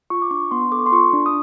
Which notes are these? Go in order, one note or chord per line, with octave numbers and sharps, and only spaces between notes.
F4 C#6
D6
D4 C#6
B3 C6
A4 D6
C#6
C6
F4 C#6
D4
D#6